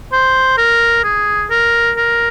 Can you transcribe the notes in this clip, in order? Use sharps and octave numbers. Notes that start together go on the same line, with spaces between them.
C5
A#4
G#4
A#4
A#4